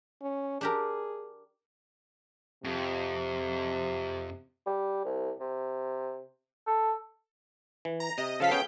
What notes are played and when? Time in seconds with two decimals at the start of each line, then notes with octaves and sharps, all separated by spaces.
0.22 C#4
0.61 D4 G4 G#4 A#4
2.64 F2 C3
4.66 G3
5.05 C2
5.40 C3
6.67 A4
7.85 E3
8.00 A#5
8.18 C3 D#5
8.40 C#3 F3 A4 F5 B6
8.51 B3 C#4 G#4 G5 G6